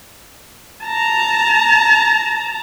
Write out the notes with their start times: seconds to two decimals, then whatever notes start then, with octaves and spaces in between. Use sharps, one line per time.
0.85 A5 A#5